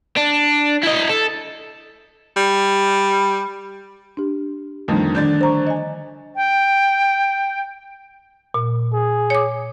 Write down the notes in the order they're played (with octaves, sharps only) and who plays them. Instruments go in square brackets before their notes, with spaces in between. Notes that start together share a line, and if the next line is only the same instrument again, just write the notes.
[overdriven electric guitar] D4
E4 D#5
A4
[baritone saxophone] G3
[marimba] D4 G4
[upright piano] F2 D3 D#3 [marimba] F3 G3 A3
[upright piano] D3 D4 A6 [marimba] D#3 G6
[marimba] C5 A#5 C#6
D#5 G#5
[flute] G5
[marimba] A#2
[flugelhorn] G#4
[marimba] C#5 D6